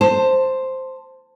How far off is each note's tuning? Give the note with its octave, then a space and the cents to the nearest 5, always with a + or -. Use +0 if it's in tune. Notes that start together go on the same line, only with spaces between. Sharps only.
C5 +0 A5 +15